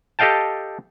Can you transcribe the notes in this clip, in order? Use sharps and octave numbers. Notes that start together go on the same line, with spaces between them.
G4 A4 D#5 F5 G5 A5